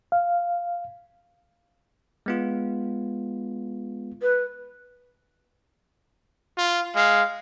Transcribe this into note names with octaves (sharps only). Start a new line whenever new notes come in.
F5
G#3 B3 F4
B4
F4
G#3 F5